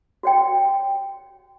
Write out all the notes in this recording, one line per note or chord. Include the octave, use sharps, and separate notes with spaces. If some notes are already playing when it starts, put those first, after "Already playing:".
F#4 C#5 G5